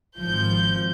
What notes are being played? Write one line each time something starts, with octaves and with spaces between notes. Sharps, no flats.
G#1 F3 G6